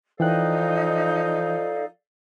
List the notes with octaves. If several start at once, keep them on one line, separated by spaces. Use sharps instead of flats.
E3 F3 D#4 A4 D5 F5 G5 F#6